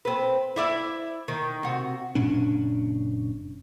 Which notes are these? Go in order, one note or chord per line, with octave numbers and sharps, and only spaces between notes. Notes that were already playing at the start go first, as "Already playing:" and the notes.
C4 B4
E4 D5 E5
D#3
C3 F#4
F#1 A#2 C#4 D4